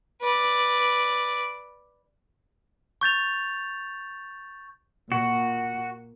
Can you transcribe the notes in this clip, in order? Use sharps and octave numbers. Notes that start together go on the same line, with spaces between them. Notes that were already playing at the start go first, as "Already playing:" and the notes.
B4 D5
C#6 G6 A6 F7
A#2 F#4